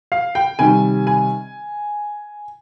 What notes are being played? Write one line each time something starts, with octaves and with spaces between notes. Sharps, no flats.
F5
G5
C3 D#3 G3 G#5
G#5